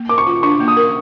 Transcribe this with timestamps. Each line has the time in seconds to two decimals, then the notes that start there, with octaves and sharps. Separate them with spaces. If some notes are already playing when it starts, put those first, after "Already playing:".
Already playing: A#3
0.09 A#4 D6
0.18 C#6
0.27 F4
0.43 D4 C#6
0.60 A#3
0.68 D#6
0.77 A#4